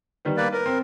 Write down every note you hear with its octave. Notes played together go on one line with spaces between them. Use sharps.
D#3 G3 B3
A#3 B4 D5
A#4 B4
C4